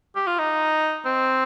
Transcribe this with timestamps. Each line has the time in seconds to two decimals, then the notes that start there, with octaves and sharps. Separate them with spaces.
0.16 G4
0.27 F4
0.39 D#4
1.06 C4